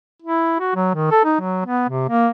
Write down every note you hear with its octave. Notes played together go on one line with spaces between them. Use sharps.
E4
F#4
F#3
D#3
A4
D#4
F#3
B3
C3
A#3